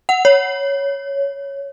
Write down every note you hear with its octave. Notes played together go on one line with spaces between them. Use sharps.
F#5
C#5